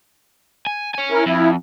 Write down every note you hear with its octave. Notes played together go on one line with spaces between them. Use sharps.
G#5
C#5 G#5
E4 A#4
F2 E4